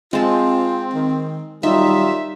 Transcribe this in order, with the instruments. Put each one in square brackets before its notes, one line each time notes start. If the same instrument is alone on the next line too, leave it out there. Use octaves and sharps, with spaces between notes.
[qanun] G#3 A5 [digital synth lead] C4 [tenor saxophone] F4
[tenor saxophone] D#3
[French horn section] D#3 F#3 G3 [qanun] D#4 [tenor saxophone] F4 [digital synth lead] E5